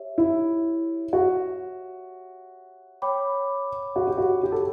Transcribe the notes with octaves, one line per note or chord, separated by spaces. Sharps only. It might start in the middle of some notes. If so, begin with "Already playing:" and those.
Already playing: G4 C#5 E5
E4
F#4
C#5 G5 B5 D6
F#4
G4
F#4
G4
A4